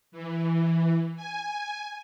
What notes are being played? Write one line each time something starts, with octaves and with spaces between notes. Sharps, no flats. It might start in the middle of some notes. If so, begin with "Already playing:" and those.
E3
G#5